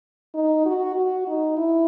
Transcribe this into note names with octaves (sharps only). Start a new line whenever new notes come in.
D#4
F#4
F#4
D#4
E4